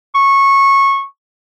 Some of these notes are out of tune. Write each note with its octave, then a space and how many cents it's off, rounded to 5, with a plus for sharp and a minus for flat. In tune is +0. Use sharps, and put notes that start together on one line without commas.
C#6 -15